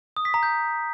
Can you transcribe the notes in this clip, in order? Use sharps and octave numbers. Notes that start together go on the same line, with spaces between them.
D#6
B6
A#5
G6